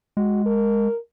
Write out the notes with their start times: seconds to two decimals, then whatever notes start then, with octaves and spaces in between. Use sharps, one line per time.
0.17 G#3 F#4
0.45 A#4